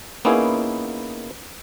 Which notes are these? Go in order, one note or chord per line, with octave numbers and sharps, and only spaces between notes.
A#3 B3 C#4 D#4 E4 G#4